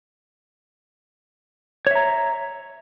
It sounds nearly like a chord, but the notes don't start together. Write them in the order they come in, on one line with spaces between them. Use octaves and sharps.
C#5 E5 A#5